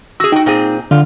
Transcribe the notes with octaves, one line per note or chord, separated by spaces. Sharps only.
F#4 G#4 E6
D#4 F#4 G5
A#2 C4 G#4
D3 F4